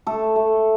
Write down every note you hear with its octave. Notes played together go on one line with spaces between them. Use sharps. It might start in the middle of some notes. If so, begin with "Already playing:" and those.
A3 A4
A3